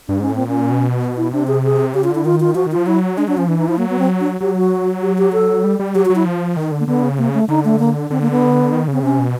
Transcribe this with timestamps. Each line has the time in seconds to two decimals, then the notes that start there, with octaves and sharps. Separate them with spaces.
0.08 G2 D4
0.19 G#2 C#4
0.29 A2
0.35 A#2 C4
0.47 C#4
0.71 B2
1.17 E4
1.32 C3 D4
1.47 G#4
1.64 G#4
1.94 C#3 G4
2.04 F4
2.09 D3
2.15 E4
2.25 D#3 F4
2.40 F4
2.55 F3 F#4
2.66 D#3
2.72 F3 F4
2.86 F#3 E4
3.17 G#3 D4
3.28 F#3 D4
3.37 F3 C#4
3.48 E3 D4
3.58 D#4
3.68 F3 E4
3.78 F#3 A#3
3.90 B3
3.99 C4
4.20 D4
4.40 F#3 G4
4.56 F#4
5.02 G4
5.18 G4
5.33 A4
5.64 G3
5.79 G3
5.95 F#3 G4
6.05 F#4
6.10 F#3
6.15 E4
6.26 F3
6.57 D#3
6.72 D3
6.80 A#3
6.87 D3 B3
7.03 C#3
7.18 C3 A#3
7.28 C#3
7.34 A3
7.48 D3 D#4
7.65 A3
7.79 A#3
8.10 D3 C4
8.21 A#3
8.31 B3
8.73 D#3
8.88 C#3 C4
9.03 C3 C#4
9.19 B2